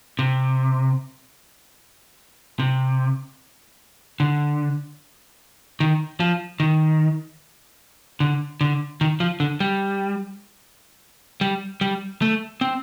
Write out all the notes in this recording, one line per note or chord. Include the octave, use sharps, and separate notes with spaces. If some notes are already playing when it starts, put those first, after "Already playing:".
C3
C3
D3
D#3
F3
D#3
D3
D3
D#3
F3
D3
G3
G3
G3
A3
C4